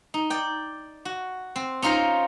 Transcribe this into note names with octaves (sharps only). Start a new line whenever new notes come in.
D#4
D5 G5
F#4
C4
C#4 D#4 F4 A#4 C5